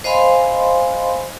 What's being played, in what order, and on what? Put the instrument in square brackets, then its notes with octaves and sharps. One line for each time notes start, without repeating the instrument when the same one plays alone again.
[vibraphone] C5 D#5 F5 G#5 B5 C6